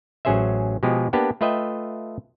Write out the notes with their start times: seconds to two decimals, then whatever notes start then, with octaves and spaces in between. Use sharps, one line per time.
0.25 A1 F#3 C#4 G#4 C5 E5
0.83 B2 F3 G#3 G4 G#4
1.13 A#3 B3 D4 G4 B4
1.41 A3 F4 B4 D#5 E5 G5